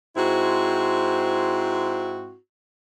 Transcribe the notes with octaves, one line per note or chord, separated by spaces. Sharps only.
G#2 C4 E4 F#4